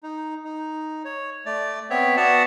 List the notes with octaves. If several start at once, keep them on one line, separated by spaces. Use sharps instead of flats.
D#4
D#4
C#5
A3 D5
B3 C4 C#5 E5
B3 F#4 D5 E5 F#5 A5